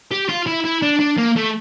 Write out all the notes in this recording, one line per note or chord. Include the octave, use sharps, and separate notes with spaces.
G4
F4
E4
E4
D4
D4
A#3
A3